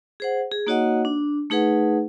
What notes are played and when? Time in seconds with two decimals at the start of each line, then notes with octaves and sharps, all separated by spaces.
0.20 G#4 C5 F#5
0.51 G#4
0.67 A#3 D#4 F#4 C#5 D#5 F#5
1.05 D4
1.50 A3 D#4 G#4 B4 F#5